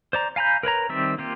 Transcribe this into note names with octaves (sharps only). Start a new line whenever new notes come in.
C5 D5 A#5
F5 G#5 A#5 B5 G6
A#4 B4 C#5 A#5
D#3 G3 C4 D5 E5
A#3 F4 G4